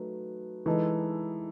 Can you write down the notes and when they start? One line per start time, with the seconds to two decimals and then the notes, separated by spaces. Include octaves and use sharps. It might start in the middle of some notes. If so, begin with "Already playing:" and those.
Already playing: F#3 A3 D#4 B4
0.66 E3 G#3 D#4 A4